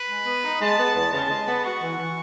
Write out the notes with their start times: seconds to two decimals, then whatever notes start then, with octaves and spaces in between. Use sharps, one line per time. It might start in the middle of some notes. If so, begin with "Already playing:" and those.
Already playing: B4
0.10 G#3
0.27 B3
0.44 D#4
0.61 G#3 A5
0.78 B3
0.96 E2
1.13 C#3 A5
1.30 G#3
1.48 B3
1.64 F#4 C#6
1.82 E3
1.99 E3